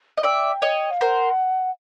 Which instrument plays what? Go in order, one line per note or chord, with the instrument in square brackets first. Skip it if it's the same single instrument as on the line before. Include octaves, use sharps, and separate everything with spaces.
[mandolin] D#5
[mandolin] D5 E5 [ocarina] G5
[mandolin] C#5 D#5
[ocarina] F5
[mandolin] A#4 C5 [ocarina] F#5